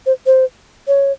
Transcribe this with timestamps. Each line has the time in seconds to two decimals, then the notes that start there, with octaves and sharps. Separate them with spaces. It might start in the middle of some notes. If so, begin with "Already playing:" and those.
0.06 C5
0.26 C5
0.88 C#5